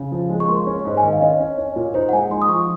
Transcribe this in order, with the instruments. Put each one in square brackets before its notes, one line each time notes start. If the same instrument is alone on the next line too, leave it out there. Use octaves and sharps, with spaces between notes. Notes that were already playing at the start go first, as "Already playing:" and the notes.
Already playing: [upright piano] C#3
F3
G#3
[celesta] C#6
[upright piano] A#3 [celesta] C6
[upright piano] C#4
G#2
[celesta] G#5
[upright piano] D#3
[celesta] F5
[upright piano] C#4 [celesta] D#5
[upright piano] C#4
C#4
A#2
[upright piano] D#4 [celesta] C5
[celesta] F#5
[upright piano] G#3 [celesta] G#5
[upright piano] D#4 [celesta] C6
[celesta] D#6
[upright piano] F3 [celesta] C#6